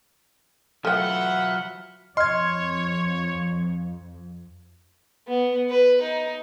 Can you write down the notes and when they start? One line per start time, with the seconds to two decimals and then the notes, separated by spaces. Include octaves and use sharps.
0.85 F#3 A3 F4 B4 E5 F#5 G5 F6
2.17 F2 C#5 D#5 C6 F6 G#6
5.28 B3
5.69 B4
6.01 D#4